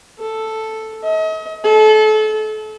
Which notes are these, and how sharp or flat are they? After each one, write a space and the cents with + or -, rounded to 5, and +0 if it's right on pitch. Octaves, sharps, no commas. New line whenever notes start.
A4 +0
D#5 +40
A4 -30